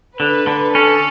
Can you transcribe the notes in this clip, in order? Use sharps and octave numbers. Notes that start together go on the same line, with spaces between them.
D3 B4
D3
C#4 A4